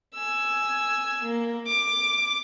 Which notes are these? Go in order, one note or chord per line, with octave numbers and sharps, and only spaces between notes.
G#5 E6
A#3
D6